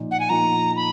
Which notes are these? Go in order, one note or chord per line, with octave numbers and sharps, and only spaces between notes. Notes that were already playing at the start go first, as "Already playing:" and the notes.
Already playing: A#2 F3 A#3 D#4
F#5
G#5
A#2 F3 A#3 D#4 A#5
B5